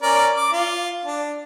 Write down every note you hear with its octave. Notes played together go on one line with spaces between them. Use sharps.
C#4 A#4 D5
D6
F4
D4